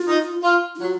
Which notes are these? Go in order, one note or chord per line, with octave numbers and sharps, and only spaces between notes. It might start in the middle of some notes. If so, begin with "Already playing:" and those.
Already playing: F4
D#4
F4
D#4
F#3 F4